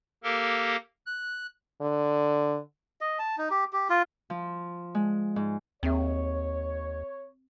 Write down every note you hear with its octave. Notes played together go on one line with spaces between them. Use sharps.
A#3 G4 A4 A#4
F#6
D3
D#5
A5
D#4
G4
G4
F4
F3
G#3
G#2
D#2 C4 G#4 C#5 E5